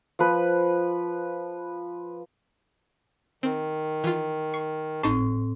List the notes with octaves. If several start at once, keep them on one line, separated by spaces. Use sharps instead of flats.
F3 B4
D#3 C4
E3 F4
C#6 C7
G#1 A2 C4 D#4 A5